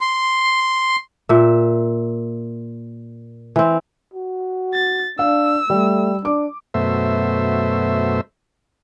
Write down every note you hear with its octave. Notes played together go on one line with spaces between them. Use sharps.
C6
A#2 E5
E3 C4
F#4
A6
D4 F5 E6
G3 A3
D4 D6
F#2 B2 A3 C5 E5